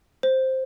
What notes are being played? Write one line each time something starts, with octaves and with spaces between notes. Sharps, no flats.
C5